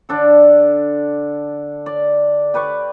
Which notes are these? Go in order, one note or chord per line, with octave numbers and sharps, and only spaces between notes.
D3 D4 A4
D5
G4 B4 D5 C#6